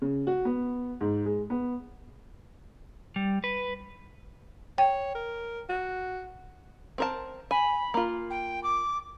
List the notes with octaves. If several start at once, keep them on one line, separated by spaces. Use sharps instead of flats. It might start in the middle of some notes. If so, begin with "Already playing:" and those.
C#3
F#4
B3
G#2
G#3
B3
G3
B4
C#5 G5
A#4
F#4
C4 A#4 A5
G#5 B5
A#3 F4
G5
D6